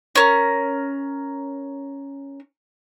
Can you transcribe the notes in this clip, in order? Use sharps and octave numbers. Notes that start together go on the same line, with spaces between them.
C#4 A#4